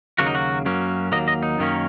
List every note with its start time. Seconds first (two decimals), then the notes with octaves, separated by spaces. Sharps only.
0.18 D#2 C#3 F#3 A#3 C#4 F#4
0.26 D#4
0.35 F#4
0.65 F#2 F#3 A#3 C#4
1.12 D#2 C#3 F#3 A#3 D#5
1.28 D#5
1.43 D#4
1.58 F#2 D#3 A#3 C#4